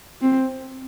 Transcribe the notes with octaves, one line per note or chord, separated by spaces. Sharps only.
C4